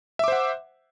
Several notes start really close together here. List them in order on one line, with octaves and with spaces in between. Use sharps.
E5 D6 C5 F#5